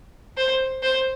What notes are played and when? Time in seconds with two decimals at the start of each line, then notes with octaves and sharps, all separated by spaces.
0.37 C5
0.83 C5